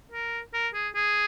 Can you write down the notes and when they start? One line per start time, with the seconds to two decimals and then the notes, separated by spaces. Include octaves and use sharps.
0.11 A#4
0.54 A#4
0.74 G#4
0.95 G#4